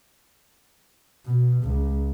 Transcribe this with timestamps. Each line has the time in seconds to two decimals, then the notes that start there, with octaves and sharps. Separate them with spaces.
1.25 B2
1.63 C#2